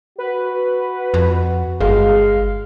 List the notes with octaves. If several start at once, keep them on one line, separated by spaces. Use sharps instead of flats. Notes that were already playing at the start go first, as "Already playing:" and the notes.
F#4 B4
F2
G1 G#3 F5